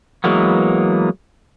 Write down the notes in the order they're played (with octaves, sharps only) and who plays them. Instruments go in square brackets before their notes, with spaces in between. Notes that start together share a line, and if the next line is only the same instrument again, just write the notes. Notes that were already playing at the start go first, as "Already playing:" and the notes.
[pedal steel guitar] E3 F#3 G#3 A#3 B3